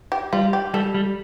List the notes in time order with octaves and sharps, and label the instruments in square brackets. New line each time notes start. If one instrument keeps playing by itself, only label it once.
[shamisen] G4
[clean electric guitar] G3 [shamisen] F4
[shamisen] G4
[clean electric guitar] G3 [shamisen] A4
[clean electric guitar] G3